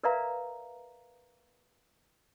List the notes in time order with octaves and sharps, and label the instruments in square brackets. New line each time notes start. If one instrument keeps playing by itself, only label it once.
[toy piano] A#4 B4 D5 E5 F5 A#5